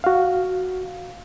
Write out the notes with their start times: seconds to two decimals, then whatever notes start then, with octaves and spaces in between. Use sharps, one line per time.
0.04 F#4 F5